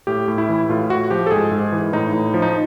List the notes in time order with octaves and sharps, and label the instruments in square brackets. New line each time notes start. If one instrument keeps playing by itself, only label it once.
[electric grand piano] A2 G4
A2
E4
E3
A2 F4
A2 F#4
F3 G4
A4
G#2 G#4
G#2
E3
A2 D#4
A2
F3
D#4